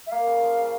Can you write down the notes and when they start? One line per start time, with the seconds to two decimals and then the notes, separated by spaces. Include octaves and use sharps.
0.07 E5
0.11 A#3 F5
0.27 C#3
0.42 F3
0.58 C#3